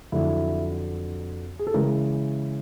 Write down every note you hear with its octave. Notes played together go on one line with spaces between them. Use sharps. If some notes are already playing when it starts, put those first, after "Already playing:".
F2 D3 F#3 E4
G#4
A4
C#3 E3 G#3 A#4